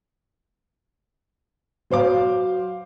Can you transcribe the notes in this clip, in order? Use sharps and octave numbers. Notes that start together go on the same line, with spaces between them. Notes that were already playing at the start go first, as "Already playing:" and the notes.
F#3 C5 F5 D6